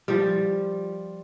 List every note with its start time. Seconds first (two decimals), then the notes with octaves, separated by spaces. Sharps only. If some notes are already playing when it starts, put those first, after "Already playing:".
0.08 F3 G3